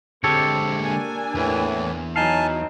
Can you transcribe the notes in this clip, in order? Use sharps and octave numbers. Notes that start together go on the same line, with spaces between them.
D3 G#3 C4 G4 A4 C#5
A#3 D4 G#5
E2 A2 E3
E3 F#3 D#4 F5 G#5 A5